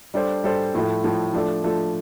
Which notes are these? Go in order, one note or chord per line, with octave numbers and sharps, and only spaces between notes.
G3 D4 A4 C5
G3 D4 A4 C5
A2 F3 A3
A2 F3 A3
F3 A3 D4 A4
F3 A3 D4 A4